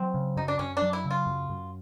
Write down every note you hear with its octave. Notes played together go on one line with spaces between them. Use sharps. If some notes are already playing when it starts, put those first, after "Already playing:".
Already playing: F#3 C4
C#3
F#2 D#4
D4
F#2 C#4
D4
F#3
E4
C#3
F4
F#2
F#2